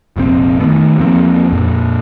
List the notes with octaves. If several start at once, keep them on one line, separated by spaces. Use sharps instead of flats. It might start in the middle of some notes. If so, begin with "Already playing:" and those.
F1 A#1 A2 C4
D#3 F3 A3 B3
E2 F3 A#3 C4
F2 A#2